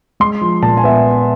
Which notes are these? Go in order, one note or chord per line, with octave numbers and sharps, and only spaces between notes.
G#3 C6
F3
A#2 A5
G#5
B3 E5